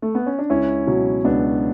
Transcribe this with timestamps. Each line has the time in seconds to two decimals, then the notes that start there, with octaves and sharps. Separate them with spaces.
0.02 A3
0.15 B3
0.26 C#4
0.39 D4
0.50 C#2 C#4 E4
0.87 B2 F#3
1.24 C#2 B3 D4